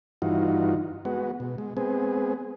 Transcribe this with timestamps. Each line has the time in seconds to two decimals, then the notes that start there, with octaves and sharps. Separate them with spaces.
0.22 G2 E3 D#4 F4 F#4
1.05 G#3 B3 F#4
1.40 B2
1.58 G#3
1.77 G#3 B3 C4 G#4